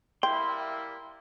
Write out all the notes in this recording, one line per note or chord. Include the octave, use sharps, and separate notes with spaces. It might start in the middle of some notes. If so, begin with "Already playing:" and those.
G3 A#3 E4 G5 C6